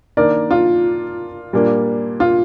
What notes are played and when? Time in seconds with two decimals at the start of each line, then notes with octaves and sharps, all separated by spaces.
0.17 D#3 A#3 D4 A#4 D5
0.51 F4
1.53 A#2 G3 A#3 D4
2.20 F4